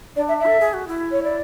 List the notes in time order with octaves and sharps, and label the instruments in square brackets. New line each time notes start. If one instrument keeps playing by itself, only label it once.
[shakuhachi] D4 [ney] D5
[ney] E5
E5
[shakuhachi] A4
G#4
F#4
E4
[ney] C#5
D5